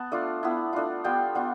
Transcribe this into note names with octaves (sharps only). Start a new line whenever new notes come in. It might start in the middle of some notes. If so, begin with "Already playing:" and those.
Already playing: B3 A5
A3 D4 F4
B3 E4
A3 D4 F4
G3 B3 F4 G5
B3 D4 F4